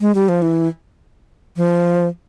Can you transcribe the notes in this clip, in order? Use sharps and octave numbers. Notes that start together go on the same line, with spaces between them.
G#3
G3
F3
E3
F3